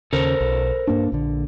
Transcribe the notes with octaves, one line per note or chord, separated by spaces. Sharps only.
D#2 C#3 A4 A#4 C5
B1
G2 A#3 D4
A#1 D3